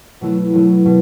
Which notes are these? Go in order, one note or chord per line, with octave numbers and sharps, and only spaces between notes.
B2 F#3 A3 E4
B2 F#3 A3 E4
B2